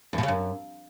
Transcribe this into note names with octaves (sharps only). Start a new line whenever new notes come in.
E2
B2
C#3
F#2